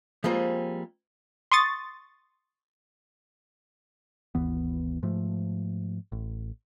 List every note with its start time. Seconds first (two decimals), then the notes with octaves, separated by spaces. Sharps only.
0.24 F3 G3 G#3 A#3 C4
1.52 C6 C#6 D#6 A6
4.35 G#1 D#2 E3 B3
5.03 G#2 F3 A3
6.12 A1